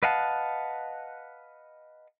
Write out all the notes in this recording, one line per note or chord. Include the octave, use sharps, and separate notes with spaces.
B4 D#5 F5 F#5 A5